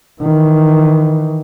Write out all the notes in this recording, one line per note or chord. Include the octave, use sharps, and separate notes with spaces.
D#3 E3